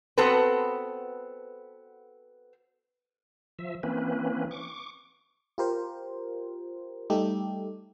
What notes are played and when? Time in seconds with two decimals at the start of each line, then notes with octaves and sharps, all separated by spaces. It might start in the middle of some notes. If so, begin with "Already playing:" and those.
0.18 B3 C4 F#4 A4 B4
3.59 F3 E5
3.83 E3 A#3 C4 C#4 B4
4.51 C#6 D6
5.58 F4 G4 A#4 C5
7.10 G3 A3 D#4 G4 A4